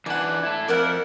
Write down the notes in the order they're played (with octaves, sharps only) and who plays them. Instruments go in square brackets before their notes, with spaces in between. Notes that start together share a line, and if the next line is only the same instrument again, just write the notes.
[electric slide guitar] E3 D4 [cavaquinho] D5 F#5
[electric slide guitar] E4 A4
[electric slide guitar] F2 [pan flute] A#4 [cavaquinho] D5 E5 F#5